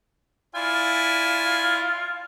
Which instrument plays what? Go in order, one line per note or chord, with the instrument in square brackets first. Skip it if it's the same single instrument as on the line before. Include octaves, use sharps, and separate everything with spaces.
[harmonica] E4 D5 G#5 [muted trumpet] F4